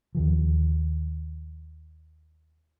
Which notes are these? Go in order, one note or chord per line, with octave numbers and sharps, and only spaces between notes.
D#2 D#3 F3